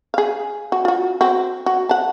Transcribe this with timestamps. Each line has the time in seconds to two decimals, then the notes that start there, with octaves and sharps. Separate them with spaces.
0.14 G#4 F5
0.72 F#4
0.85 F4 F#4
1.21 C4 F#4
1.66 F#4
1.89 F#5 A5